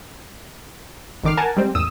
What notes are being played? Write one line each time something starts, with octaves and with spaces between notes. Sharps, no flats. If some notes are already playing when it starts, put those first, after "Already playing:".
G#1 D3 D#3 D6 F6 C7
A#4 F#5 G#5 A5
G3 G#3 C4
A1 E2 D#6 E6